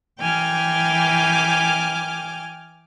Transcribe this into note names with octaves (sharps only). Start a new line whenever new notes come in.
E3 G5 G#5 D6 F6